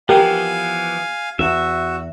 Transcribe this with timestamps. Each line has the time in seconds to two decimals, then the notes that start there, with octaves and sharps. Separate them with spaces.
0.09 E3 F3 B3 G4 A#4 F5 G#5
1.39 E2 F#4 E5